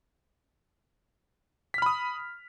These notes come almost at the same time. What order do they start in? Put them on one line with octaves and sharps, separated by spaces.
B6 F6 B5 D#6